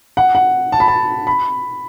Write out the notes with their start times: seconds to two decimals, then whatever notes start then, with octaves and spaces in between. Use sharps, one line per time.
0.17 F#5
0.35 F#5
0.72 A5
0.80 B5
0.88 A5
1.27 B5